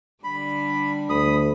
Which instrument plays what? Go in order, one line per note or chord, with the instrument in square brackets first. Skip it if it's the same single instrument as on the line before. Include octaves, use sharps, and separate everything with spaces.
[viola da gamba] D3 G3 D4 [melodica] B5
[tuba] D2 [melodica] B5 D#6